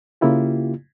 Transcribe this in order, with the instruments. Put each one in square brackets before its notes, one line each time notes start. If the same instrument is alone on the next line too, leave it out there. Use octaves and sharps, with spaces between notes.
[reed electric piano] C#3 A#3 E4 F4 G4